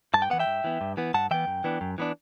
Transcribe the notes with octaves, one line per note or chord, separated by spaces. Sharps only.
G2 A5
G5
E3 B3 F#5
E5 G5
G2
E3 B3
G2
E3 B3
G2 F#5 A5
E3 B3 E5 G5
F#2
E3 B3 D4
F#2
E3 B3 D4